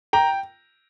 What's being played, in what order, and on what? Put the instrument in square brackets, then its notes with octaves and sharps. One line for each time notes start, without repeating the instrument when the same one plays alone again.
[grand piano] G5 A#5